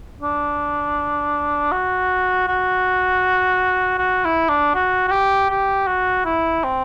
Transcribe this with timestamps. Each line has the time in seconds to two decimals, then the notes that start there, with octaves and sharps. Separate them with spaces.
0.22 D4
1.72 F#4
2.48 F#4
3.98 F#4
4.25 E4
4.49 D4
4.74 F#4
5.08 F#4
5.12 G4
5.49 G4
5.87 F#4
6.25 E4
6.64 C4